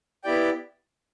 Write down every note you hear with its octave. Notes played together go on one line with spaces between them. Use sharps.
B3 E4 G4 D5 G5